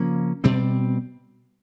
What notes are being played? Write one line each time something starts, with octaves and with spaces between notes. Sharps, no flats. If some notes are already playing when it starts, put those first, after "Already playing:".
Already playing: C#3 F3 A#3 C#4
B2 G3 C4